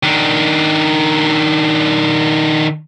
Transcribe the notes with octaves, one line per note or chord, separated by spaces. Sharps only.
D#3 D4